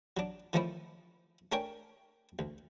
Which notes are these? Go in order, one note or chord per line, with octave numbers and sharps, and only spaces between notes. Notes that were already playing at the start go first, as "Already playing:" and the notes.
F#3 D4
D#3 F3 A3 C#4 D#4 E4
A3 D4 A#4 C#5 G5 G#5
D2